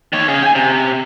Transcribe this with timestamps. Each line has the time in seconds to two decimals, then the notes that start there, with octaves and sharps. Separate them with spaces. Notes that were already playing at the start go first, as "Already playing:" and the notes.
0.13 D#3 C#5
0.28 C#3 G#4
0.43 G5 G#5
0.55 C3